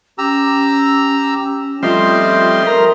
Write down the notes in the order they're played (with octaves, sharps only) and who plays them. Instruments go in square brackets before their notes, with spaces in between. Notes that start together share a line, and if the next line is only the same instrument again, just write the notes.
[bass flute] C#4 [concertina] G4 A#5 E6
[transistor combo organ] F3 G3 C4 [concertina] A3 D#5 C6 [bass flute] F4
[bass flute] A#4 [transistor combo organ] A#5